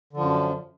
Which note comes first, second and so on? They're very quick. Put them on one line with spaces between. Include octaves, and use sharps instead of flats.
D3 F3 F#2